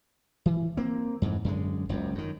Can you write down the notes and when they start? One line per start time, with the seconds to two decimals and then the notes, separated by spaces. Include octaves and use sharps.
0.46 E3
0.77 A#3 C4
1.22 F2 G#2 E3
1.45 F#2 D3 G#3
1.89 F#1 C#2 F#2
2.15 F#2 D#3